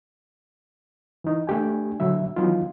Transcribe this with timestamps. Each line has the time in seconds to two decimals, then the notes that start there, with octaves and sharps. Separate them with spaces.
1.24 E3 D#4
1.47 A3 D4 G4 G#5
2.00 A#2 D3 F#3 E5
2.36 D#3 E3 F#3 B3 D#4 F4